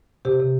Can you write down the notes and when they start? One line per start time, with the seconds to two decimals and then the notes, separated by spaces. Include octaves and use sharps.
0.25 C3 G4
0.40 C3